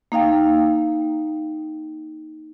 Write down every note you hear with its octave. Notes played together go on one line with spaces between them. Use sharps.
A#3 D#4 F5 G5